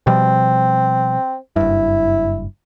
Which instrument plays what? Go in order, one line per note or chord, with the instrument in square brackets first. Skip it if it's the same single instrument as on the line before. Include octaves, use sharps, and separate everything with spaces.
[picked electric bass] B2 F3 G3 [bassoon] C4
[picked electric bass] F#1 G2 [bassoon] E4